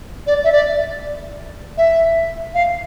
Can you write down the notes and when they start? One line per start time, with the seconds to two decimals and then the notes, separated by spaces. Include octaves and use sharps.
0.27 D5
0.44 E5
0.52 D5
1.78 E5
2.54 F5